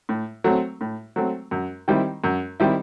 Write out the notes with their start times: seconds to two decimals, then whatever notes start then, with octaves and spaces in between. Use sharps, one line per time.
0.09 A2
0.44 F#3 A3 C4
0.81 A2
1.16 F#3 A3 C4
1.51 F#2
1.88 D#3 G3 C4 E4
2.24 F#2
2.60 D#3 G3 C4 E4